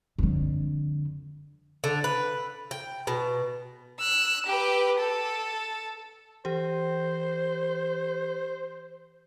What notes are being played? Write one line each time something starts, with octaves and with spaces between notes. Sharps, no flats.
F2 D3
D3
B4
G5
B2
E6 F#6
G4 B4
A4
E3 G4 C5